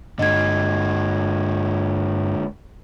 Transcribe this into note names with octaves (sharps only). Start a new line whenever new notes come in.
G2 D3 G#3 D#5 G#6